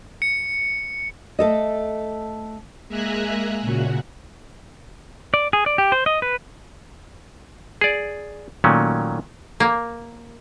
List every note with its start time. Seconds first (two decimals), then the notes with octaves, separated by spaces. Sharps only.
0.22 C#7
1.39 A3 A4 D#5
2.88 G#3 A#3 E5 G#5 A#5 F#6
3.61 A#2 C#3 F#4
5.34 D5
5.53 G#4
5.66 D5
5.78 G4
5.92 C5
6.06 D#5
6.22 B4
7.81 G#4 D5
8.64 A#2 D#3 F#3 A3 C#4
9.60 A#3